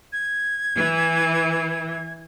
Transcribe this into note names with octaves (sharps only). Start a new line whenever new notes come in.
G#6
E3